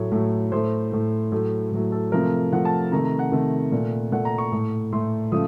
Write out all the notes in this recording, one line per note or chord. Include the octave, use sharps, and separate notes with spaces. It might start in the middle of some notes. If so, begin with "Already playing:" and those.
Already playing: A2 F#3 A3 C#5
A2 F#3 A3
A2 A3 C5
A2 A3
A2 F#3 A3
A2 F#3 A3
A4
C3 F3 A3 A#4
C3 F3 A3 F#5
A5
C3 D#3 A3 A#5
A#5
F#5
C3 D#3 A3
A#2 A3
A#2 A3 F#5
A#5
C#6
A2 A3
A2 A3 C6
C#3 F3 A3 D#6